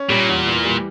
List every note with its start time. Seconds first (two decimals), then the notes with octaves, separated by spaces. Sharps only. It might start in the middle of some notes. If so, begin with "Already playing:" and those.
Already playing: C#4
0.09 A#2 G3
0.29 E2
0.47 E3
0.65 G3